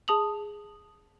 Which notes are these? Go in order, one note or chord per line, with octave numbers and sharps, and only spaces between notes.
G#4 A5 D#6 F7 F#7